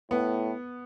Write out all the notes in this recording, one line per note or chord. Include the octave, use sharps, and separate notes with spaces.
A2 B3